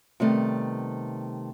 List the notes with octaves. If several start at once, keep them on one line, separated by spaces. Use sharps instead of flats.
C3 D#3 G3 A3 B3